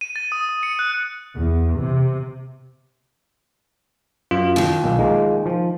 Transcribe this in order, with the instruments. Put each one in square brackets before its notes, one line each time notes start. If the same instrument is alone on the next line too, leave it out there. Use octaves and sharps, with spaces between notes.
[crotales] D#7
A6
D#6
D#6
C#7
F#6
[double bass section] E2
C3
[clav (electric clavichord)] F#2 [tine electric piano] F4
[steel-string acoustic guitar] D#2 D#3
[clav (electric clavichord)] B1 A#3
G#3 A#3
F3